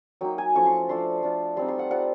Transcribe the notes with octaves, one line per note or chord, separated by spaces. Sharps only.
F#3 A#3 D#4 G5
G#5
F3 A3 C#4 E4 C#6
C6
F3 A3 D4 C6
A3 D4 F4
G3 C4 D#4 C6
C6
F#5
G3 C4 F4 F#5